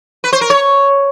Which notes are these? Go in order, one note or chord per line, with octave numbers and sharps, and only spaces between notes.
B4
C5
A#4
C#5